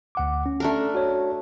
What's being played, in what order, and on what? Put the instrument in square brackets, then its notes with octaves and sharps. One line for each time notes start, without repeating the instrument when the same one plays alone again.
[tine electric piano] D2 F#5 D6
C#4
[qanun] A3 D4 A#4
[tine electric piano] F#4 C#5